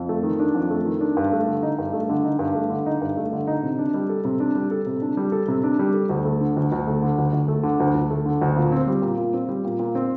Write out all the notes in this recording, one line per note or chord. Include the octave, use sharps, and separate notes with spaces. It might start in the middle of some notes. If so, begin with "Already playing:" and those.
Already playing: F2
A3
D#3
D4
F2
A3
D#3
D4
G2
A3
D3
D#4
G2
A3
D3
D#4
G2
A3
D3
D#4
G2
A3
D3
D#4
C3
D4
G3
A4
C3
D4
G3
A4
C3
D4
G3
A4
C3
D4
G3
A4
D2
A3
D3
D2
D2
A3
D3
D2
D2
A3
D3
D2
D2
A3
D3
D2
A#2
C4
G3
A#2
A#2
C4
G3
A#2
A#2
C4